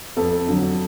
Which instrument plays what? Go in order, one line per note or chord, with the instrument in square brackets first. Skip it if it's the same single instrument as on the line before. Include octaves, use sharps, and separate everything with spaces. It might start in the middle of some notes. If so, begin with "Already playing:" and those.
[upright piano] F2 A4
D3 F#3